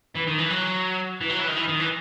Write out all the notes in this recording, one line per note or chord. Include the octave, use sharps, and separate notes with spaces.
E3
D#3
E3
F#3
E3
F#3
E3
D#3
E3
D#3
E3